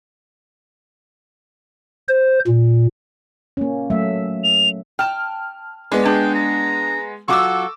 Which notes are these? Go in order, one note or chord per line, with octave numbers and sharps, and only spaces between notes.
C5
A#2
A#3 C#4
F#3 A3 E5
F7
G5 A5 F6
G#3 B3 D4
D4 G#4 G5
A#5
F#3 F4 F#4 A4 C#6 D6 E6